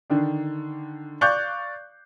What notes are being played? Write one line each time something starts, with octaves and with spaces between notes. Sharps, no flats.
D3 D#3 D4
D5 F5 C#6 F#6 G6